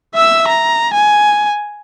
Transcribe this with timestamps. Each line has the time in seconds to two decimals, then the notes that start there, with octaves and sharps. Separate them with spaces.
0.14 E5 E6
0.48 A#5
0.94 G#5